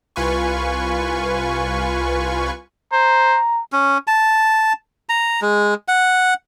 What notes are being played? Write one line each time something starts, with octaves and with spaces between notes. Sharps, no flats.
C2 F4 B4 G#5 C#6
C5 A#5
C#4
A5
A#5
G#3
F#5